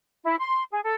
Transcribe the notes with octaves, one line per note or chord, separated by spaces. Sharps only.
E4
C6
G#4
A4